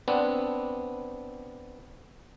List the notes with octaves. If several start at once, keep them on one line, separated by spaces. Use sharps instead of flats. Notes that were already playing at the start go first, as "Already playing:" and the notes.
B3 C4 D4